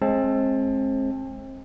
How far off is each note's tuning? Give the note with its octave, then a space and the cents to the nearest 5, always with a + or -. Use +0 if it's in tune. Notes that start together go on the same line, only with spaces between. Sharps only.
G#3 +25 C4 +35 A5 +0